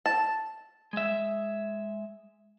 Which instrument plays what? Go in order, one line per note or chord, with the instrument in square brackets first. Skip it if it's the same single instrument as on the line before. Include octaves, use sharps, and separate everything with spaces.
[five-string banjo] A5
[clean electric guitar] G#3 E5